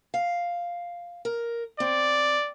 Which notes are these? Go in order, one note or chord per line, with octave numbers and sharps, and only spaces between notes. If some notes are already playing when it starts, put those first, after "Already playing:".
F5
A#4
C4 D5